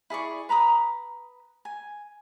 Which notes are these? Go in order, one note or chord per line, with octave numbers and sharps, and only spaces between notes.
E4 G#4 D5 C#6
B4 A#5 B5 D#6
G#5